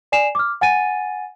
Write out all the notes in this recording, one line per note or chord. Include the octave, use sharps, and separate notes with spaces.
D5 G#5 C7 E7 F7
D6 F6
F#5 G#5 A6 D#7